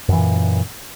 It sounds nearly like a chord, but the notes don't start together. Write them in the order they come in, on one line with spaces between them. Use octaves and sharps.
F#2 E3 A#2